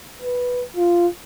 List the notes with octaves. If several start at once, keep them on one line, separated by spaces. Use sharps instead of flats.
B4
F4